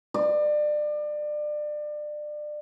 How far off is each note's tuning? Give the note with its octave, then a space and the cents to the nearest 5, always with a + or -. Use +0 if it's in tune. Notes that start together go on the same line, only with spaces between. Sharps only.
D5 +30